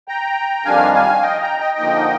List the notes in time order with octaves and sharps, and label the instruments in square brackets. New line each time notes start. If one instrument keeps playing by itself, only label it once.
[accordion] G5 A#5
F2 D#3 G3 D4 F5 G#5
F5 G#5
D#5 G5
G5 A#5
D#5 G5
D3 F3 A#3 D#4